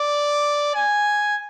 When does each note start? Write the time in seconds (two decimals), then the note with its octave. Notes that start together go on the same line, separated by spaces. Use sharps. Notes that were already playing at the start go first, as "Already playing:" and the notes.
Already playing: D5
0.75 G#5